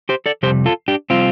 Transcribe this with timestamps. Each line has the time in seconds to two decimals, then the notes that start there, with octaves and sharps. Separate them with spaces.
0.09 G4 C5
0.26 A4 D5
0.43 F2 C3 G3 G4 C5
0.66 F4 A4
0.88 D4 G4
1.10 C3 G3 C4 F4